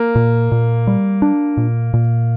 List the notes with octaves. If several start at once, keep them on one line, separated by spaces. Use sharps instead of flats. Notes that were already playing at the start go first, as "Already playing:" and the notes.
Already playing: A#3
A#2
A#2
G3
D4
A#2
A#2